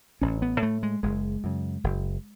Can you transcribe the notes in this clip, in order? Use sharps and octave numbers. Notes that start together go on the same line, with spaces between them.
A1 C#4
B3
A2 A3
G#3
F#1 G#3
F#2 C#3
F#1